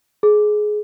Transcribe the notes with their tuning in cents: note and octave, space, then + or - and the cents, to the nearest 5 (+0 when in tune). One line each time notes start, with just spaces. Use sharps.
G#4 +20